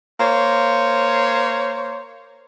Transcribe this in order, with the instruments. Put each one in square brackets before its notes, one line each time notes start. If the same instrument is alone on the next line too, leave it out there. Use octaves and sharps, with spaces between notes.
[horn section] A#3 C5 C#5